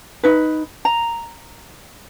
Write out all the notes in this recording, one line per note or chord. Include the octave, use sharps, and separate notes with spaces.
D#4 B4
A#5